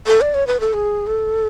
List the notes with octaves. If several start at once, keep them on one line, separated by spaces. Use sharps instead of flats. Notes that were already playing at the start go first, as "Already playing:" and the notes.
A4
D5
C#5
B4
A4
G#4
A4